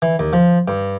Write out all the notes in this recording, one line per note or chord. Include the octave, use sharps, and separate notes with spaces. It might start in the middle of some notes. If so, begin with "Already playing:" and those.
E3
D#2
F3
G2